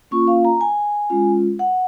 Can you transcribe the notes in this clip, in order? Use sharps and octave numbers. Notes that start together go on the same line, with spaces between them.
A#3 C#4 F4 C#6
F5
A#5
G#5
G#3 C#4 F4
F#5